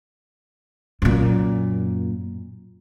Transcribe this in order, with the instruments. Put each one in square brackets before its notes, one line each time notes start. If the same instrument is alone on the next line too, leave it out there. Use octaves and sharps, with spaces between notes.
[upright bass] F#2 A#2